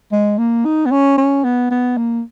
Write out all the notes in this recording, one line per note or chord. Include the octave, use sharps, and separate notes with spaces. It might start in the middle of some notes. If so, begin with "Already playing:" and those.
G#3
A#3
D#4
B3
C#4
C#4
B3
B3
A#3